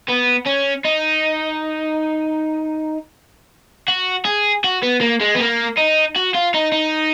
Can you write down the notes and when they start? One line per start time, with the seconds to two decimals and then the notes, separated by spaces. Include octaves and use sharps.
0.08 B3
0.46 C#4
0.85 D#4
3.88 F#4
4.25 G#4
4.64 F#4
4.83 B3
5.01 A#3
5.21 G#3
5.35 B3
5.40 A#3
5.77 D#4
6.16 F#4
6.34 F4
6.54 D#4
6.72 D#4